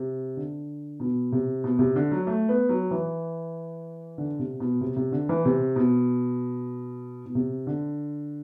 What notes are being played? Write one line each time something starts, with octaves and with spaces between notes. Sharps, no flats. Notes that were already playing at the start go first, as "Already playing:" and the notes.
Already playing: C3
D3
B2
C3
B2
C3
D3
F#3
A3
B3
F#3
E3
D3
C3
B2
C3
C3
D3
E3
C3
B2
B2
C3
D3